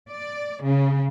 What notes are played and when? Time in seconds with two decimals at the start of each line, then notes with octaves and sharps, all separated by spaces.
0.10 D5
0.64 C#3